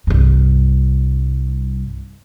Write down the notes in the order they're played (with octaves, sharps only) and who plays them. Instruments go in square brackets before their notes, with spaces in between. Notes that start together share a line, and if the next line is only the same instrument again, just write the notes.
[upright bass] C2 G2